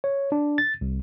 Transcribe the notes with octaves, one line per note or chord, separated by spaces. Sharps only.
C#5
D4
A6
C2